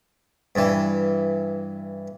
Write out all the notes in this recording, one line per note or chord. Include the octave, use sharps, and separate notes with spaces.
G2 E3